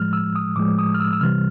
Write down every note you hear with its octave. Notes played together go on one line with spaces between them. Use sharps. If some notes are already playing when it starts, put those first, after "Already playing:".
Already playing: A2 F3 G#3 F6
E6
D#6
A2 F3 G#3 D6
D#6
F6
E6
E6
C3 E3 G3 F6